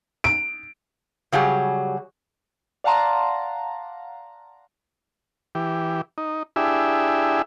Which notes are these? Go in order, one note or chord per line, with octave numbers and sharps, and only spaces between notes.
D7
C#3 F#3 G3 G#4
D5 F5 F#5 A5 A#5 C6
E3 G4
D#4
D4 E4 G4 G#4 E5